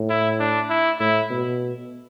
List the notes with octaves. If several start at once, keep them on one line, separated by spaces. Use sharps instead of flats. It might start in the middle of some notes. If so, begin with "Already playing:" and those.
Already playing: A2
E4
D4
E4
A2 E4
B2